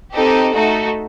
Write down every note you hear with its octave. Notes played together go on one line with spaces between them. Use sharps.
C4 D#4 G4 A4
A3 D#4 F#4 A4